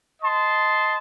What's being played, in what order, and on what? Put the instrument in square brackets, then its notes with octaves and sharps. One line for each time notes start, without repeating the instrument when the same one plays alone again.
[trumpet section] D#5 A5 C6